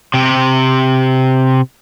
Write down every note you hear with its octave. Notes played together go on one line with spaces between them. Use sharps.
C3 G4